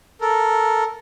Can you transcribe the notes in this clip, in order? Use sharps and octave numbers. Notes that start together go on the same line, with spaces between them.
A4 A#4